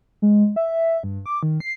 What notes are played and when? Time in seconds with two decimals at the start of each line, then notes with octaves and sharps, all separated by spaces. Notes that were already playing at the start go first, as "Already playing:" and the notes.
0.22 G#3
0.56 E5
1.03 G2
1.26 D6
1.43 D#3
1.60 C7